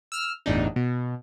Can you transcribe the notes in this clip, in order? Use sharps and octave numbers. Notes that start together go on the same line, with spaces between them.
E6 F6
G1 E2 A2 D4 D#4
B2